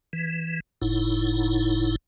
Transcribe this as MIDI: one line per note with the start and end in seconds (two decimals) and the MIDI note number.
0.13 0.60 52
0.82 1.96 30
0.82 1.96 45
0.82 1.96 63
0.82 1.96 64